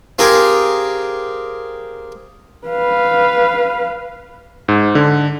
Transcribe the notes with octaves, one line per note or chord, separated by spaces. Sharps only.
C4 F4 G4 G#4 A#4
B4 F5
G#2
D3